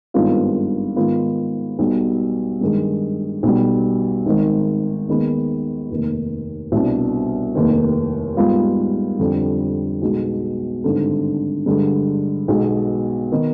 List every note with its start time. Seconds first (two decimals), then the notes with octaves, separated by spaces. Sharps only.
0.14 G#1 G2 D#3 B3 F4
0.96 G#2 D#3 B3 F4
1.79 B1 B2 G3
2.61 G2 D#3 G#3
3.43 B1 B2 G3
4.26 G#1 G#2 D#3
5.08 D#2 D#3 G#3 B3
5.90 F1 D#2 D#3
6.72 C2 B2 G3 D4
7.55 F1 D#2 D#3
8.37 G#2 G3 B3 F4
9.19 F2 D3 G3
10.02 B1 B2 G#3
10.84 G#1 G2 D3
11.66 G2 D3 G#3
12.48 B1 B2 G#3
13.32 D#3 B3 D#4